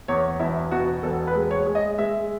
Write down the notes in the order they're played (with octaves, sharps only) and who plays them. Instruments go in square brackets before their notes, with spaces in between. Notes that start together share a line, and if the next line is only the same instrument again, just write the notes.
[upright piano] E2 C#5
E1 E4
B2 F#4
E1 A4
B4
G#3
C#5
G#3
D#5
G#3 E5